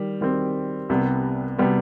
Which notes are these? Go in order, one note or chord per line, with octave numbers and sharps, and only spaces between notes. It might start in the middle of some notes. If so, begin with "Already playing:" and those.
Already playing: D#3 G3
D#3 G3 C4
C2 C3 G3 B3
C3 G3 B3